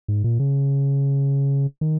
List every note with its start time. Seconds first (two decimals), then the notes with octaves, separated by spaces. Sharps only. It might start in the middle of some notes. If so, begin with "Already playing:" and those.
0.08 G#2
0.24 A#2
0.40 C#3
1.81 D#3